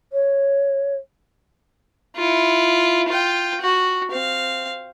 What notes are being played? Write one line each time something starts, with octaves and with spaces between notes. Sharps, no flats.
C#5
E4 F4
F4 G5
F#4
C4 F5